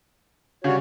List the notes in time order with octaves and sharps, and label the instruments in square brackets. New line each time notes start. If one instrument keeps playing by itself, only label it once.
[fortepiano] C#3 G3 [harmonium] F#4 C#5